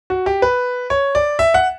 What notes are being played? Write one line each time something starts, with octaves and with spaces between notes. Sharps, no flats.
F#4
G4
B4
C#5
D5
E5
F#5